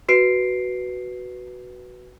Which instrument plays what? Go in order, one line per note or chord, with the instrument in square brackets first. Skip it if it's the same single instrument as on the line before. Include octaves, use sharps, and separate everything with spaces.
[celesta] F#4 B4 C7 D7